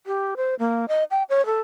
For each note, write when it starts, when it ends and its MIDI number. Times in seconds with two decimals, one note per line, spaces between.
0.07 0.34 67
0.37 0.55 72
0.59 0.85 58
0.88 1.04 75
1.11 1.23 79
1.30 1.45 73
1.46 1.61 69